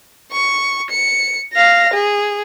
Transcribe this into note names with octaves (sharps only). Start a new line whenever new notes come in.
C#6
C#7
F5 A#6
G#4